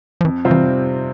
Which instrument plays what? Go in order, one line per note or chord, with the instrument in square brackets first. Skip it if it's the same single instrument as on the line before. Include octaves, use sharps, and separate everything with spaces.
[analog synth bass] F3
[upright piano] F2 [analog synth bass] E3
[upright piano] C3 G3 C4 F4
[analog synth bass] E3